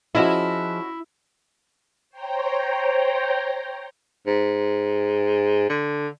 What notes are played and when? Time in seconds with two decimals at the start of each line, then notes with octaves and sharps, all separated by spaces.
0.15 F3 C#4 E4 F#4 G#4 D#5
2.10 C5 C#5 G5 A#5
4.27 G#2
5.70 D3